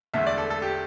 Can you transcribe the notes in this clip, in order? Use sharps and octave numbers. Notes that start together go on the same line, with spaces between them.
E1 E2 D3 A3 E5
D5
A4
A4
G4